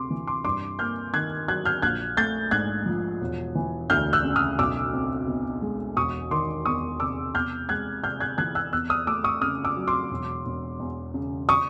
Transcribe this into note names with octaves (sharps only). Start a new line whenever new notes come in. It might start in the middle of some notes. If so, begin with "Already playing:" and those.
Already playing: D2 C3 C6 D6
E3
C6 D6
G2 C6 D6
A#3 F6 G6
D#3 F#6 G#6
F#3 F#6 G#6
F6 G6
A#1 F#6 G#6
A3 G6 A6
G#2 F#6 G#6
F3
E1
E3
D2 F6 G6
E6 F#6
C#3
D#6 F6
B1 D6 E6
C4
B2
G#3
E1 C#6 D#6
D#3 C6 D6
E2 C#6 D#6
C3 D6 E6
E2 F6 G6
G#3 F#6 G#6
C3 F6 G6
F#6 G#6
E3 F#6 G#6
E6 F#6
E2 E6 F#6
D#6 F6
A3 D6 E6
C#6 D#6
C#3 D#6 F6
D6 E6
F#3
C6 D6
E1
E1
E2
C#3
C#6 D#6